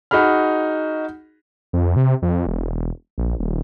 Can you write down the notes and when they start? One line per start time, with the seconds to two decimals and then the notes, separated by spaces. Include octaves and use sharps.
0.11 D#4 F#4 G#4 B5 F6
1.73 F2
1.96 C3
2.22 F2
2.47 E1
3.18 A#1
3.39 D#1